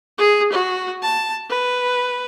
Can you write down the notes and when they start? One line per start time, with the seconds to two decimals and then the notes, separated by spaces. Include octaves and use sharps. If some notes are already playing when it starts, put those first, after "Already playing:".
0.18 G#4
0.53 F#4
1.02 A5
1.50 B4